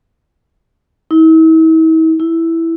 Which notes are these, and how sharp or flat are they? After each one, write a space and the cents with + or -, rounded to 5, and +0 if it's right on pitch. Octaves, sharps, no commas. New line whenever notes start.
E4 -45
E4 +0